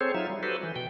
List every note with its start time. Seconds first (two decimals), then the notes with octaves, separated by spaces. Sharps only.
0.01 C4 G#4 A4 C5 C#5
0.14 F#3 D#4 F4 E5
0.30 G3
0.43 F#4 G4 A4 B4 C5
0.63 E3
0.76 B2 G5